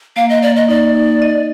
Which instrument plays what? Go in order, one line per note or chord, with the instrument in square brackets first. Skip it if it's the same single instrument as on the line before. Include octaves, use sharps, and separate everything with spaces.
[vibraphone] A#3 [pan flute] F5
[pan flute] D#5
[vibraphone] A#3 [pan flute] D5
[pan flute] D#5
[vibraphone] D#4 [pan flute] D5
[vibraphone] D#4
D#5